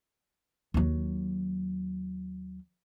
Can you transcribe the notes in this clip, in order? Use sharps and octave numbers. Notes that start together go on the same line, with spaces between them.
D#2 F#3